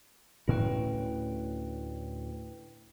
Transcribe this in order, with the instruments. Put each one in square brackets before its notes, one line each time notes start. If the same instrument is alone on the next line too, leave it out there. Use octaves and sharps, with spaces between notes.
[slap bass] D2 A2 C#4 [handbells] E4 B4 G5